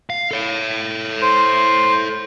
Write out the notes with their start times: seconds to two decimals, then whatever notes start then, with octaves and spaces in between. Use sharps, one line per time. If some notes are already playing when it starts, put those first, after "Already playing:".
0.10 F5
0.31 A4 C#5
1.22 C5